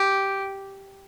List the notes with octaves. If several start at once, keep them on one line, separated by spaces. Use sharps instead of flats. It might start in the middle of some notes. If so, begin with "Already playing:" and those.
Already playing: G4